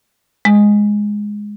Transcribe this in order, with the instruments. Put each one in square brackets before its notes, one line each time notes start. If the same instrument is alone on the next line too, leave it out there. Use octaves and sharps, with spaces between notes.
[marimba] G#3